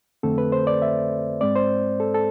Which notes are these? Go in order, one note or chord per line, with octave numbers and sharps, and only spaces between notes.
F2 D3 A3 C4 A4
B4
C5
D5
E5
G#2 G#3 C4 D5
C5
A4
A4